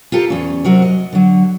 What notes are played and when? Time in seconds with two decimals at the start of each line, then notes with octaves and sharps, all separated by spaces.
0.12 F4 G4 A4 A#4
0.30 E2 C#4
0.64 C3 F#3 F#4 A#4
0.82 D#5
1.13 D3 F#3